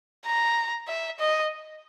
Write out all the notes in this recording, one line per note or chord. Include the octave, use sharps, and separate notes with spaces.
A#5
E5
D#5